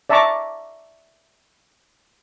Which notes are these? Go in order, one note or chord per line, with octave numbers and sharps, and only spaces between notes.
D5 E5 A5 A#5 C#6 D6